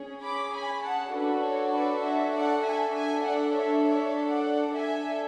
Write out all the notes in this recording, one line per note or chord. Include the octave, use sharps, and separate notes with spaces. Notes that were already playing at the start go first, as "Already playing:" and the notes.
Already playing: C#4 G#4
B5 D6
G#5 B5
F#5 A5
D4 F#4 A4 B4
C#5
B4 D5
C#5 E5
D5 F#5
E5 G#5
D4 A4 E5 G#5
D5 F#5
C#5 E5
C#5 E5
D5 F#5
D4 A4 E5 G#5